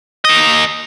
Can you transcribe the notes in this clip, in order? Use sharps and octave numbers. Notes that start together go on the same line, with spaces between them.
A#3 D#5